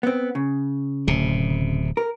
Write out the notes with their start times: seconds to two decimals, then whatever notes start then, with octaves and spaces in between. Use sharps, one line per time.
0.03 B3 C4
0.35 C#3
1.07 D1 C3
1.97 A#4